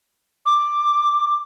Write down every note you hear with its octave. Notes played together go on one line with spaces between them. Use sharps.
D6